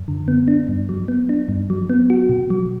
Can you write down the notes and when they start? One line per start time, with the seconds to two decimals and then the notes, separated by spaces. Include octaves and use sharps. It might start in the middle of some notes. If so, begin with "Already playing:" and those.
Already playing: F#2
0.08 D3
0.28 B3
0.48 D4
0.68 G2
0.89 F#3
1.08 B3
1.29 D4
1.49 G2
1.70 F#3
1.90 B3
2.10 F#4
2.29 B2
2.50 F#3